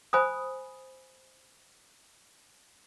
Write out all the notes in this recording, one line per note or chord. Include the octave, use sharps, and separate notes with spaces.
C5 G#5 B5 D#6